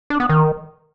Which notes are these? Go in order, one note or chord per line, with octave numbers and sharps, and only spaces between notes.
D4
B3
D#3